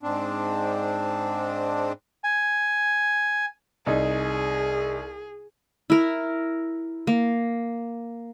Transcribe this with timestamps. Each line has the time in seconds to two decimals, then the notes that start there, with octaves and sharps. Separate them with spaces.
0.03 G#2 C4 D4
2.24 G#5
3.86 C2 D#4 G#4
5.90 E4 A#4
7.07 A#3